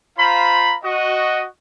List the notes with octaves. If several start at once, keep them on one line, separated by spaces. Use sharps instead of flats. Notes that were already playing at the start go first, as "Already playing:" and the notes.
F4 C5 F5 A#5 B5
F#4 D#5